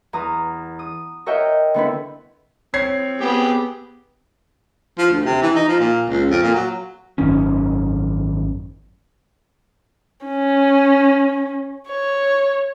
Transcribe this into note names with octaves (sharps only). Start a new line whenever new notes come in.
E2 A#5 D#6
D#6
A#4 C#5 D#5 E5 F#5 G5
D3 B3 C4 E4
C4 C#5 G#6 C7
B3 G4 G#4
F3
D2
C3
E3
D#4
F3
A#2
C#2
F2
A#2
F#3
G#1 F#2 D#3 C#4
C#4
C#5